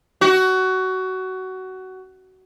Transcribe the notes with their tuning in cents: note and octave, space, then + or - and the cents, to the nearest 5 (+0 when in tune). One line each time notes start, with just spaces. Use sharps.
F#4 +20